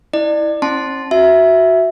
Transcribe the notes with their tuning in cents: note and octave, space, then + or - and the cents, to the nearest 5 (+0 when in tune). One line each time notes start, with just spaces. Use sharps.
E4 -25 D5 +30
C#4 -45 A5 -5 C6 +0
F#4 +0 E5 +0